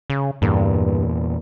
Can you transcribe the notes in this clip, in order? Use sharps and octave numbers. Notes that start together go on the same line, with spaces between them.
C#3
E2 G2 A#2